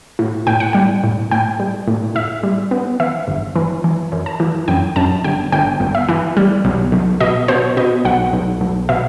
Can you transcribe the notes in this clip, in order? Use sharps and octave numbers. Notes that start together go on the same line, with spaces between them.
A2
A2 G5
F#5
G3 G5
A2
A2 G5
G3
A2
A2 E5
G3
B3
E3 E5
G1
E3
E3
F#2
A5
E3
F#2 G5
F#2 A5
G1 G5
G1 G5
G1
E5
E3
G3
B1
B1
B2 D#5
B2 C5
B2 D#5
B1 F#5
B1
B1
B2 E5